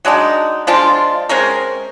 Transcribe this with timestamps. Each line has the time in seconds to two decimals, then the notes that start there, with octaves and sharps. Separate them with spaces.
0.05 F#3 G#3 D4 D#4
0.67 F3 G#3 D4 F4
1.29 G#3 C4 C#4 A#4